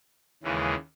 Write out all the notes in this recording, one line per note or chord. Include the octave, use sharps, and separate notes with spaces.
D#2 C#3 E3 G#3